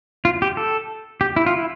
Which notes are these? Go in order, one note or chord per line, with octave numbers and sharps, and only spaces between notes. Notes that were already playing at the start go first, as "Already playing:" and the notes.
F4
G4
A4
G4
E4
F4
E4